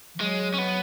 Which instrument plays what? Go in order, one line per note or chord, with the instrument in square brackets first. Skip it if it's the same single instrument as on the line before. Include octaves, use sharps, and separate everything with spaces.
[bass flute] E3
[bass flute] F#3 [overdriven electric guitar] G#3
[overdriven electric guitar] C#4
B3